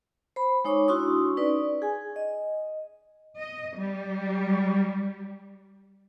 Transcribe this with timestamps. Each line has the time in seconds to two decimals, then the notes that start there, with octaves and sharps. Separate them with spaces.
0.36 C5 B5
0.64 G#3 D#4 C#5 C#6 D6
0.88 D4 E4 F#4 C6 C#6 D#6
1.37 C#4 D#4 B4 D5
1.82 G#4 G#5
2.16 D#5
3.39 D#5
3.77 G3